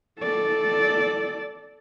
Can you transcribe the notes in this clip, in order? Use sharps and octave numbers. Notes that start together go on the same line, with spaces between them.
A4 D5